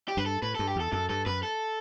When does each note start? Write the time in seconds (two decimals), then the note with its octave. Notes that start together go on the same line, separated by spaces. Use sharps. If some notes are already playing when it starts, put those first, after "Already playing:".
0.08 G4
0.17 G2 B4
0.26 A4
0.42 A2 B4
0.55 G2 A4
0.67 G4
0.76 E2 A4
0.93 F#2 A4
1.09 G2 A4
1.26 F#2 B4
1.43 A4